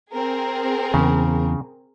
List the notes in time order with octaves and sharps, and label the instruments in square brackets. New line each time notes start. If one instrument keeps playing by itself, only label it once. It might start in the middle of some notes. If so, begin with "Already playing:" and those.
[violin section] C4 G#4 A#4
[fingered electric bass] E2 [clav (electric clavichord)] C#3